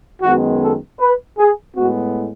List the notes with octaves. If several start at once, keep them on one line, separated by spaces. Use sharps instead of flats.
F#2 D#3 G#3 B3 F#4
A4
B4
G#4
A2 G#3 B3 F#4